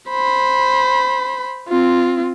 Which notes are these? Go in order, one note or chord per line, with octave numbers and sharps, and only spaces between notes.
C5 B5
C4 F4